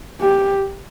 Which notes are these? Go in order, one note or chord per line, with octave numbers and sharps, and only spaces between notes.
G4